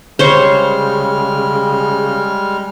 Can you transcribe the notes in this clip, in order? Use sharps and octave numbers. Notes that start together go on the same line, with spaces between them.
C#3 G3 G#3 C5 C#5 C#6 F6